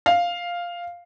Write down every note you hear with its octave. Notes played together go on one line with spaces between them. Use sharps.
F5